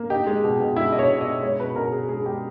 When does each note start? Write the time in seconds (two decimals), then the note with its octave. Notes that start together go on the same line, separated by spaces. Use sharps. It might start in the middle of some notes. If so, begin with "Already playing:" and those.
Already playing: A#3
0.10 D#4 G4
0.27 G#3
0.44 B2
0.60 B2
0.76 G#3 E4
0.92 B2 D#5
0.99 C#5
1.09 B2
1.21 D#5
1.26 B2
1.43 G#3 C#5
1.59 B2 B4
1.76 B2 A#4
1.92 B2 G#4
2.09 G#3 G#4
2.25 G#3 G4